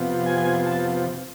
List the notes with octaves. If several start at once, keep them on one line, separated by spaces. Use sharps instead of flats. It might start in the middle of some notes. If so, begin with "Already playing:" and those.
Already playing: F2 C3 F3 B3 F4
G#5
A5